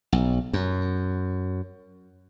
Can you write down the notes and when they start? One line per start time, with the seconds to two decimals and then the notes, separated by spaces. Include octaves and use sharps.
0.12 B1
0.53 F#2